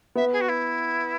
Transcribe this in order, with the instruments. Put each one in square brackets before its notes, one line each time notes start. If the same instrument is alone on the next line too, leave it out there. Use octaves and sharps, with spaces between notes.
[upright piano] B3 [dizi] E5
[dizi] G#4
F#4
E4